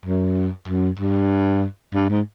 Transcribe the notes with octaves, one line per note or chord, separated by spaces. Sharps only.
F#2
F#2
G2
G2
G#2